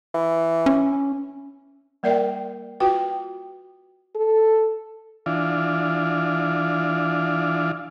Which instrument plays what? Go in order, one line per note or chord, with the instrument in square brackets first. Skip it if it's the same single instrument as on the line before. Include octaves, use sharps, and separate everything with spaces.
[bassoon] E3
[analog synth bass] C#4
[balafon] G3 A#3 A#4 D5 E5 G5
F4 F#4 B4 G5
[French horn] A4
[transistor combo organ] E3 D4 F4